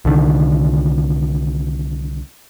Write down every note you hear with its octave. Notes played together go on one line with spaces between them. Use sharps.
C2 D3 D#3